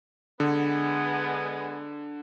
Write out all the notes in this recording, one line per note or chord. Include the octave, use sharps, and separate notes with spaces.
D3 G#3 B3